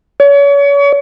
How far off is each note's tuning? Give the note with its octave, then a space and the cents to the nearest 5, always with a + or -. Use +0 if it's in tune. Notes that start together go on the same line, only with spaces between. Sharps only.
C#5 +35